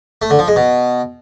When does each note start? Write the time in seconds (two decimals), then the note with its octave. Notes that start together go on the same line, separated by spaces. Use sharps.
0.22 A3
0.30 D3
0.39 F3
0.48 G#3
0.56 B2